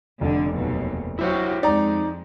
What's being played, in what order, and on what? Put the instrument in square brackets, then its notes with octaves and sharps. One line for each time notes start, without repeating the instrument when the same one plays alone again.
[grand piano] F1 [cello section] D3 D4
[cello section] D#2 B2 F#3
[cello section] F#3 F#4 G4 [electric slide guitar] E4 C5 C#5
[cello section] F2 G#3 [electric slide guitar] D#4 [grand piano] D5 A#5